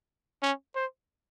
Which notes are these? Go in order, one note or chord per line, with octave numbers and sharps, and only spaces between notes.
C#4
C5